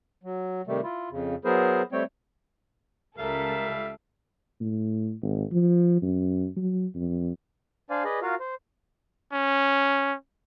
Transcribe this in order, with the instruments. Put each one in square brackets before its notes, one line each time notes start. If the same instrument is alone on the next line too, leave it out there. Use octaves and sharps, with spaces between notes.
[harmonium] F#3
C3 D#3 G3 A3
E4 F4
F2 C#3
F#3 B3 E4 G#4 A#4 C5
G3 A3 C4 C#5 G5
[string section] C#2 A4 [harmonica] G3 F5 [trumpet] A#4 [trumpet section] E5
[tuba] A2
G#1
F3
F#2
F#3
F2
[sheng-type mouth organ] D4 C5 D5 F5 G#5
G#4 B4 D5 D#5
F4 F#4 A#4 F5
C5
[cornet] C#4